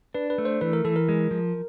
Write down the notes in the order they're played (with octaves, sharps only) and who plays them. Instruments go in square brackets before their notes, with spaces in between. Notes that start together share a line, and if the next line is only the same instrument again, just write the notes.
[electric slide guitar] D4 [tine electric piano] B4
[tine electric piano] B4
[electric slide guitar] A3
[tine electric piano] C5
[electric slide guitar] E3 [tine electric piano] B4
[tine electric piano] A#4
[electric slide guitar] E3 [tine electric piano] A4
[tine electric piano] A#4
[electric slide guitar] G#3
F3